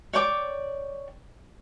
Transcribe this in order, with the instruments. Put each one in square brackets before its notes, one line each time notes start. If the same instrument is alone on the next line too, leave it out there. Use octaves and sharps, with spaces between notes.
[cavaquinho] C#5 D5 G5 D6